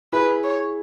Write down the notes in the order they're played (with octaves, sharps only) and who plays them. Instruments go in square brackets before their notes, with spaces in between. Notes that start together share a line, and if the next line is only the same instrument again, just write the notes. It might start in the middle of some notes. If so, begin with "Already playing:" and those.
[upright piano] E4 G#4 [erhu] B4
[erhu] C#5